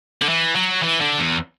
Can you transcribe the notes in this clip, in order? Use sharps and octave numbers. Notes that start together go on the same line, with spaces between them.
D3
E3
F#3
E3
D3
E2